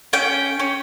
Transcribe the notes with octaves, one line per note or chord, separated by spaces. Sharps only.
C#4 G5
C#4